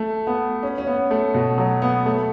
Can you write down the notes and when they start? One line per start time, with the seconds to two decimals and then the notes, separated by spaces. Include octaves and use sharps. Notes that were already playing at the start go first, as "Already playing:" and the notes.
Already playing: A3
0.27 B3
0.63 C#4
0.78 C#4
0.87 B3
1.11 A3
1.34 B2
1.58 F#3
1.82 B3
2.06 A3